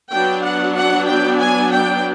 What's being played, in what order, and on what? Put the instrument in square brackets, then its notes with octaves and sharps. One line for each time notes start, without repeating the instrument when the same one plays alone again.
[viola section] F#3 B3 D4 G5
F#5
F#5
G5
G#5
G5